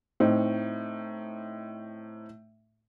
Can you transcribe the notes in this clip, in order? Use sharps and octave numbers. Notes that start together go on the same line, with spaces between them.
A2 C4 D#4